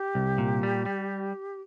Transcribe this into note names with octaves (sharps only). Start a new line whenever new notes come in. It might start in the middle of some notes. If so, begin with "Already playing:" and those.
Already playing: G4
C2
A#2
G3
G3